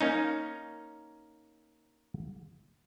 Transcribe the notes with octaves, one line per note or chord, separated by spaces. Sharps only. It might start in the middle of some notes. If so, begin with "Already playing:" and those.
A#3 C#4 D#4